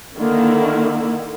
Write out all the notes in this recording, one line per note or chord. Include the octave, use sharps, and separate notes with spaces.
D3 D#3 A#3 E4